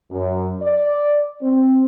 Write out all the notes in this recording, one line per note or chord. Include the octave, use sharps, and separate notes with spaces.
F#2
D5
C4